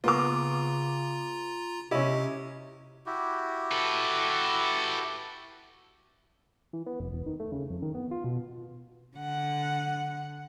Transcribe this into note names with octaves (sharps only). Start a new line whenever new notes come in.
C#3 A#3 B3 F4 A#5 D6
C3 C#4 E4 G4 D#5
E4 F#4 G4
A4 B4
E3
B3
F1
E1
D#3
A3
C#3
F2
D#3
B3
F4
B2
D3 F#5